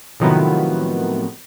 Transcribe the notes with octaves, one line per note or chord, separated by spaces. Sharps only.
A2 C3 D#3 F3 F#3 B3